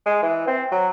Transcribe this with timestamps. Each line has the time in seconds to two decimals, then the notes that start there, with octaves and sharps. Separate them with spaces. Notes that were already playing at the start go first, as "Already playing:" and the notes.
0.06 G#3
0.23 E3
0.47 C4
0.72 F#3